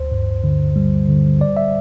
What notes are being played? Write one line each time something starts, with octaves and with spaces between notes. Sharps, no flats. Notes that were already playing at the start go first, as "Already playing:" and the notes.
Already playing: D2 C5
G2
D3
G3
D3
G3 D5
E5